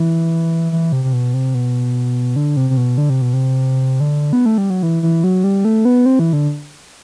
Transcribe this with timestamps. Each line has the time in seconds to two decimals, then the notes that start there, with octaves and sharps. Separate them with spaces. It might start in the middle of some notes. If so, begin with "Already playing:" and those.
Already playing: E3
0.72 E3
0.92 C3
1.04 C3
1.13 B2
1.34 C3
1.54 B2
2.36 D3
2.57 C3
2.70 C3
2.77 B2
2.98 D3
3.10 C3
3.22 B2
3.33 C3
4.00 D3
4.33 B3
4.46 A3
4.58 G3
4.70 F#3
4.83 E3
5.03 E3
5.24 F#3
5.44 G3
5.65 A3
5.85 B3
6.06 C4
6.19 E3
6.33 D3